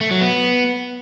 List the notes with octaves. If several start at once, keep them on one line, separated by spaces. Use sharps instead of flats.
A3
F#3
B3